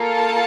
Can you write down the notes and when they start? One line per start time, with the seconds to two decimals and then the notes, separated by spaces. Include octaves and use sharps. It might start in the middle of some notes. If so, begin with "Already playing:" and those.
Already playing: A#3 F4 A4
0.13 A5